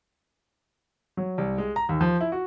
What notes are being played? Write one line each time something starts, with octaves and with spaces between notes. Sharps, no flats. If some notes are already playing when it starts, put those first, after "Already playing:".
F#3
C2
G#3
A#5
D#2
F3
E4
F#4